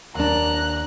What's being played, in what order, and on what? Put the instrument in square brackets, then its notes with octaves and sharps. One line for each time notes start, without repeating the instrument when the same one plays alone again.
[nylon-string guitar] D#2 D4 [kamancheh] A#5 F#6